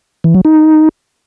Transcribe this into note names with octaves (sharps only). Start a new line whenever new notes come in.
E3
F#3
D#4